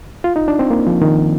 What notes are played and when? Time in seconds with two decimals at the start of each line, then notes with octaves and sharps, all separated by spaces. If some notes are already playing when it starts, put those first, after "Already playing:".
0.24 F4
0.36 D#4
0.48 D4
0.59 C4
0.70 A#3
0.87 F3
1.02 D#3